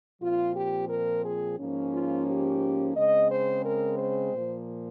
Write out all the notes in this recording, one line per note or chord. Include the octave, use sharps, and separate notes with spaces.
A#2 F3 C4 F4
G4
A#4
G#4
G#2 F3 A#3 C#4
F4
G4
C#3 G#3 C4 D#5
C5
A#4
C5
A#2 F3 A#3